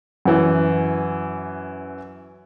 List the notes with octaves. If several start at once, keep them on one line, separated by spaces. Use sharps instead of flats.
F#2 E3